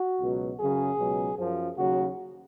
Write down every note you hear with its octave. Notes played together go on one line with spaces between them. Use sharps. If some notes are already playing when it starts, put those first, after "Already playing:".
Already playing: F#4
C#2 B2 F#3
F#2 C#3 F#3 G#4
C#2 B2 F#3
F#2 F3
D#2 C#3 F#3 F#4